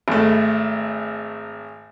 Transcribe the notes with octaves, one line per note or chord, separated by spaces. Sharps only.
G#1 A3